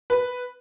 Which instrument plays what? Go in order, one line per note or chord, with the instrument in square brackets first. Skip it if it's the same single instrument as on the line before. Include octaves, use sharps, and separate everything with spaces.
[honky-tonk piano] B4